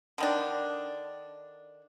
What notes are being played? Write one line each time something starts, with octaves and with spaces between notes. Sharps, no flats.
D3 D#3 D4